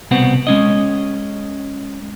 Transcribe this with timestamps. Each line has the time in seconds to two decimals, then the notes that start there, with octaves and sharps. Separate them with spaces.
0.11 C2 B2 B3 C4 F#5
0.47 G#3 C#4 D#5